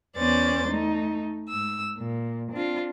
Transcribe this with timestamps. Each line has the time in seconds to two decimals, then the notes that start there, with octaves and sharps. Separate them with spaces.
0.18 E2 B3 C#4 C5 D5 A6
0.70 A3 D#4
1.50 G#2 E6
1.99 A#2
2.53 C4 D4 F4